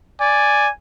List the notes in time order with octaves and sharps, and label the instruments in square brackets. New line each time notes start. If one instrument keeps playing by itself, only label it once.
[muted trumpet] D5 [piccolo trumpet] G#5